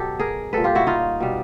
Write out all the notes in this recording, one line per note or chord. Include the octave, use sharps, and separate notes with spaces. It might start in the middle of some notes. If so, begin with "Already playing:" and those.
Already playing: B2 F#3 G4 A4
G#4 A#4
A#2 G3 A4 B4
F4 G4
E4 F#4
D#4 F4
B2 G3